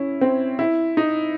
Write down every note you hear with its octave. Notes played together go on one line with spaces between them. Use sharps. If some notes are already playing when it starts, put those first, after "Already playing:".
Already playing: C#4 E4
C4
E4
D#4